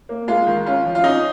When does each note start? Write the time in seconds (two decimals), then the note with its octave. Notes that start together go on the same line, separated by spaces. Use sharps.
0.09 A#3
0.28 G#3 F4
0.47 D#3
0.66 C#4 F4
0.85 F3
0.95 F4
1.04 C#4 D#4